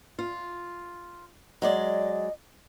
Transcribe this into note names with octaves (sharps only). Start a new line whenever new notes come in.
F4
F#3 G#3 D5 D#5